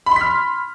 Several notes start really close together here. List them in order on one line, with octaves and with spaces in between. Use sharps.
B5 C6 B6 F6